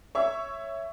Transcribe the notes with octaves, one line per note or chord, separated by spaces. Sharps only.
C#5 E5 C#6 E6